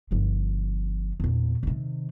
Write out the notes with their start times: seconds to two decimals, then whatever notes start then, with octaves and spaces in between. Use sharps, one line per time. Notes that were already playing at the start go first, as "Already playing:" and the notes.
0.11 G1 F3
1.20 E2 A#2
1.63 C3 D#3